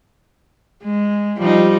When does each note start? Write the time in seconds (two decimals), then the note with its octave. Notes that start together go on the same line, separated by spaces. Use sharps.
0.83 G#3
1.38 F3 G3 D#4